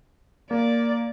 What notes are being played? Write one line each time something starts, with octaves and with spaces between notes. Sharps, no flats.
A#3 D5